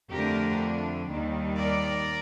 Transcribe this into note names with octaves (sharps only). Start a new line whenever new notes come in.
F2 D3 A3 D4 G4 A#4
D#2 D#3 G3
A#4 D5